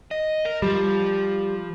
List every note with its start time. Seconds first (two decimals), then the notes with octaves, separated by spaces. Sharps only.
0.11 D#5
0.45 A#4
0.62 F3 G3